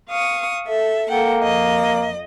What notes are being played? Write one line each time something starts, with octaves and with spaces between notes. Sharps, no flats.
F5 C#6 D#6
A4 E5
A#3 A4 F#5 G5
F2 D#5